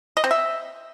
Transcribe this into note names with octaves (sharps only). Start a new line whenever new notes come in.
D#5
C4
E5